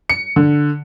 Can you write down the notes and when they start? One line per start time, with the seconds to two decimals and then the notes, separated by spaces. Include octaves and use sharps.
0.10 C#7
0.36 D3